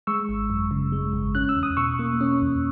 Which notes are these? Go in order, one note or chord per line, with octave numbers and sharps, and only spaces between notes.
G#3 C#6 E6
G#1
F#2
C#3
G#3
G#1
C#4 F#6
E6
E2
D#6
B2 C#6 E6
A#3
C#4
E2